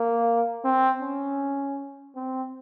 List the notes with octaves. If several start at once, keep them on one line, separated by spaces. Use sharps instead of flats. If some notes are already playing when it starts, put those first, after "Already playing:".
Already playing: A#3
C4
C#4
C4